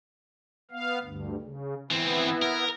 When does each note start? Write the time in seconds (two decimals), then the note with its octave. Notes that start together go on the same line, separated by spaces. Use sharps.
0.71 B3 F5
1.03 D2 G2
1.41 C#3
1.91 E3 B3 C4 E4
2.42 A#4